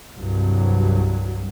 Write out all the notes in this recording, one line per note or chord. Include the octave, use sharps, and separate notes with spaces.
C2 G2 F#3